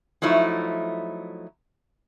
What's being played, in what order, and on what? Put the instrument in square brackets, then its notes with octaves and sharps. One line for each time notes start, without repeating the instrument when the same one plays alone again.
[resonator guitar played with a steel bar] F3 F#3 A3 D#4 E4